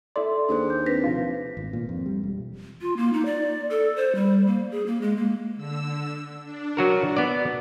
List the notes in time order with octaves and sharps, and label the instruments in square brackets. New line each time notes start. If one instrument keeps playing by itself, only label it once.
[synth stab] E4 D5 [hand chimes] A4 C6
[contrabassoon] D#2 [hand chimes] D4 G#4 C5
[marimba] G6
[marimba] C4 D4 B4 [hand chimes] A#6 B6
[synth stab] C3 F3 F4
[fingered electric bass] G#1
A#2
F2
G3
E1
[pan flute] F4
A#3
D#4
D5
A4
C5
G3
A#3
G#4
A#3
G#3
A#3
[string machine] D3 E6
D4
[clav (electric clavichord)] F#3 F#4 A#4
B3 D5